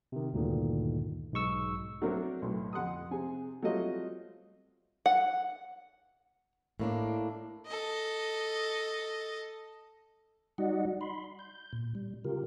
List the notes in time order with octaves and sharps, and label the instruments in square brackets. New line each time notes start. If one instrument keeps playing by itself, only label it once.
[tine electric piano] C3 D#3
D2 G2 A#2 D3 D#3
B1 G#2 G#3 C#6 E6
[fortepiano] F#3 A3 C4 D4 A4 A#4
B1 A2
F2 F#5 C6 D#6
C3 C4 G#4 G#5
F#3 G3 A3 C4 F4 D#5
[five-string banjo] F#5
[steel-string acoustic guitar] A2 A#3 D4
[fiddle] A4 D#5
[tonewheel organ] G3 D#4 F#4 D5 D#5 F#5
B5 C6
G6
A#2
G3
C#3 F4 G4 A#4